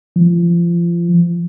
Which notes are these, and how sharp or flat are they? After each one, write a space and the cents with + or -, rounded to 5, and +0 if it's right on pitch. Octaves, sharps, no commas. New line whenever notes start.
F3 -30